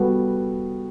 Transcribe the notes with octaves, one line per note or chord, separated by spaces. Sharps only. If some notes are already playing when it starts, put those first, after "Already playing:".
Already playing: G3 B3 F#4 A4